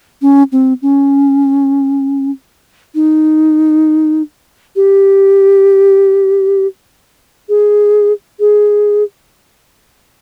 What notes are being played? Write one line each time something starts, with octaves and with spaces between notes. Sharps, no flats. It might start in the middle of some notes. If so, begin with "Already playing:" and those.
C#4
C4
C#4
D#4
G4
G#4
G#4